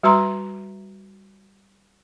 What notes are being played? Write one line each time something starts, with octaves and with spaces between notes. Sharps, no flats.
G3 F#4 B4 E5 A#5 C6